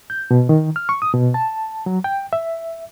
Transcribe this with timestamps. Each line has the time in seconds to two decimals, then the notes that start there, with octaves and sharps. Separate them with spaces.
0.10 G6
0.31 B2
0.49 D#3
0.76 F6
0.89 C#6
1.02 D#6
1.14 B2
1.34 A5
1.86 F#3
2.04 G5
2.33 E5